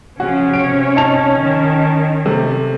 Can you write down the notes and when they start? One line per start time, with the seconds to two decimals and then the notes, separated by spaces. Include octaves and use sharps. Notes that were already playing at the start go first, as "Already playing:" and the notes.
0.20 C#3 F3 C#4 F#4
0.53 C3 C#5 D7
0.96 D#4 A5 F7
1.35 D#3
2.25 C3 A3